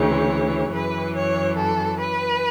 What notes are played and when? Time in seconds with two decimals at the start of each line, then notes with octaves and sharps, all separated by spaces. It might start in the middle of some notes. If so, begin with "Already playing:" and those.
Already playing: D2 C#3 E3 C#5
0.72 F#2 E3 B4
1.15 C#5
1.57 A4
2.00 B4